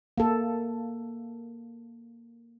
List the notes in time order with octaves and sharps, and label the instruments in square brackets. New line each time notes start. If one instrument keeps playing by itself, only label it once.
[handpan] A#3 A4